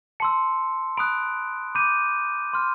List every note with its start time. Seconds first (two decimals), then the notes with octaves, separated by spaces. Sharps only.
0.20 A5 C6 E6 C#7
0.97 B5 D#6 F#6 D7
1.75 B5 D6 G6 D#7
2.53 C6 F6